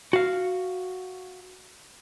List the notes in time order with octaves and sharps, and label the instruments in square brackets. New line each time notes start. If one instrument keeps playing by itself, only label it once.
[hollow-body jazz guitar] F#4 F5